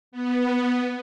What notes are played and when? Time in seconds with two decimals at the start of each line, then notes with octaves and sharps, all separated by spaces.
0.12 B3